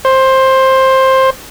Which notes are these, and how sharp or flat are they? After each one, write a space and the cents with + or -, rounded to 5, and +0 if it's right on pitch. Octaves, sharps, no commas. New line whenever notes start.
C5 +15